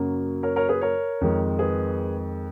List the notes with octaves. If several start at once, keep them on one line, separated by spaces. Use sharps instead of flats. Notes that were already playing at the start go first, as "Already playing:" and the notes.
Already playing: F#2 C#3 F#3 A#3
A#4 C#5
A#4 C#5
G#4 B4
A#4 C#5
F2 D#3 G#3
G#4 B4